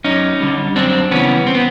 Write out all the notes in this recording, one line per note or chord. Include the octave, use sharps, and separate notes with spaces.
F#2 C#4 D#4
D3 G3
F#2 C4 D4
C#3 E3 G3 B3 C#4
C4
B3